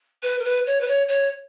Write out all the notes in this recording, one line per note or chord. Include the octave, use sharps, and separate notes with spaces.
B4
A#4
B4
C#5
B4
C#5
C#5